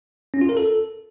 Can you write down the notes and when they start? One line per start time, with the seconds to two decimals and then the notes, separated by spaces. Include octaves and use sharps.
0.34 C#4
0.41 F4
0.49 A#4
0.57 A4